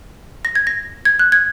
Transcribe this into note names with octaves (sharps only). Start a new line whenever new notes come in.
A#6
G#6
A#6
G#6
F#6
G#6